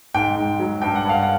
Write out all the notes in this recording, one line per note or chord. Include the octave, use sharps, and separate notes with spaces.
G#2 G5
G#2
F#3
G2 G5
F#5
G2 F5
F#5